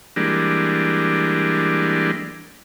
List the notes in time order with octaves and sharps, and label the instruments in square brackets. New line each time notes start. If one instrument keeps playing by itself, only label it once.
[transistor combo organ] E3 G3 G#3 A#3 D4